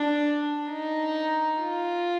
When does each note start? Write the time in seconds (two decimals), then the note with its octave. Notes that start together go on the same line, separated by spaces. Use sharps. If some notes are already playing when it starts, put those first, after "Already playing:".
Already playing: D4
0.70 D#4
1.60 F4